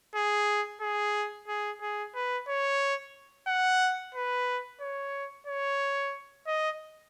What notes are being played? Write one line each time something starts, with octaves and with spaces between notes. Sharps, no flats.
G#4
G#4
G#4
G#4
B4
C#5
F#5
B4
C#5
C#5
D#5